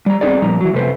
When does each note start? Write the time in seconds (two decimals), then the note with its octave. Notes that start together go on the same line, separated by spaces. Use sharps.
0.06 G3 A#5
0.21 B3 C4 D#4 G#4 D5
0.42 A#2 F3 G3 A#5
0.61 E3 F#3
0.73 F2 C3 A3 B4 C5